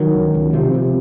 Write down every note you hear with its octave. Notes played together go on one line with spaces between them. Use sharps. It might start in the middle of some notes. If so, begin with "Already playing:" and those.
Already playing: D#3 F#3
C#2
C#2
C3 F3
C3